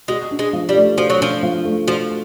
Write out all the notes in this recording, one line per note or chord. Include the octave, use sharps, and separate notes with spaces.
G#3 F#4
D4
G#3
F3
G3
A3
F3 F#4
F#3
F3 D4
F3
A3
F3 F#4